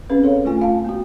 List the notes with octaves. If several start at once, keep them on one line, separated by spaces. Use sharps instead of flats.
C4 C#4 G#4 B4 F5
A4 C#5 F5
A3 F4 G#5
F4 F5 A5
B3 F#4